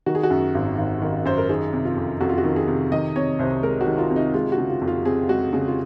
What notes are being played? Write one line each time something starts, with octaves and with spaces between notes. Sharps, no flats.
D#3 F#4
G#4
F#4
F#2
G#1
G#1
D#3
F#2 C5
A#4
D#3 G#4
C3
F4
F2
F2 F#4
F4
F#4
D#3
G#4
C3
D#3 D#5
C3 C#5
C2 C5
G#3 A#4
F#4
D#3
F4
C3
D#4
G#3 F4
F#4
C#3
F4
F2
F4
C4 G#4
G#3 F#4
C#3
F4